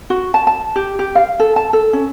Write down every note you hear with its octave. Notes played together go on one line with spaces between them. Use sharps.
F#4
A5
A5
G4
G4
F5
A4
A5
A4
C#4